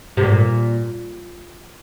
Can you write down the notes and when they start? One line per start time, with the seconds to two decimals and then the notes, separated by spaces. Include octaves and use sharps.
0.17 C3
0.23 A#2